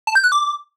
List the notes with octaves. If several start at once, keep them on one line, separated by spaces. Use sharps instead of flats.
A5
G6
F#6
D6